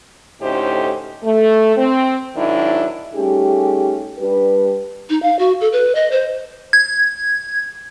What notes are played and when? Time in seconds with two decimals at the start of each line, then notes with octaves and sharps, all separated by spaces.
0.41 D2 A2 C#4 D#4 G4 C5
1.24 A3
1.77 C4
2.36 G#2 D#3 F#3 D4 E4
3.15 G3 A3 C#4 D#4 G4 G#4
4.18 G3 D4 G4 B4
5.10 D#4
5.22 F5
5.39 F#4
5.61 A4
5.73 B4
5.95 D#5
6.11 C5
6.73 G#6